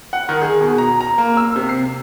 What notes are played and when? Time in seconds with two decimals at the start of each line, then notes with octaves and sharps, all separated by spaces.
0.13 F#5
0.29 D#3
0.42 G#4
0.61 B2
0.78 A#5
1.01 A#5
1.18 A#3
1.37 E6
1.56 C3
1.69 C7